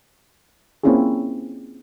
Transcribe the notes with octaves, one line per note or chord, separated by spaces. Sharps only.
A#3 C4 C#4 E4 F4 G#4